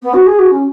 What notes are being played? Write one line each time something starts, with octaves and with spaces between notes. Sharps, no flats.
B3
F#4
G#4
F#4
C#4